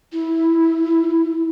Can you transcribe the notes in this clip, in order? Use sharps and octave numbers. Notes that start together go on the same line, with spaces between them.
E4